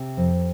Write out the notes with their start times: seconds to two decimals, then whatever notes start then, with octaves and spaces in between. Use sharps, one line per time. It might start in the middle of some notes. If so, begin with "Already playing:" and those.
Already playing: C3
0.17 F2